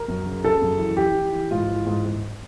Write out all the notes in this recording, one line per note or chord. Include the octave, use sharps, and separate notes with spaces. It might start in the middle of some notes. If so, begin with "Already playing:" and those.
Already playing: A#4
F#2
C#3
C#3 A4
F#2
E3
E3 G4
E3
E3
G#2 F4
E3
G#2
G#2